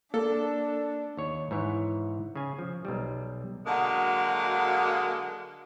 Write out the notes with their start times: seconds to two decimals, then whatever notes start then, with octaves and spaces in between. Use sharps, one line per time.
0.14 A#3 D4 A4
1.17 D#2 C#5
1.51 G#2 E3 C#5
2.35 C#3 G#5
2.59 F3
2.85 B1 G3
3.65 D3 F#3 G#3 A#3 F#4 F#5